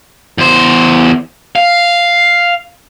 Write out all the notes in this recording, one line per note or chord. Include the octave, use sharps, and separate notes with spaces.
E2 C5
F5